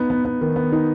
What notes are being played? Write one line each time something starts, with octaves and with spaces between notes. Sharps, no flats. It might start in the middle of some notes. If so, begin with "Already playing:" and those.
Already playing: B3 D#4
B3
B3
D#3
B3
D#4